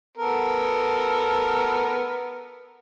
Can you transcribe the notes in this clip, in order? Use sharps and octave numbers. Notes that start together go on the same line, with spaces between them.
B3 A4 A#4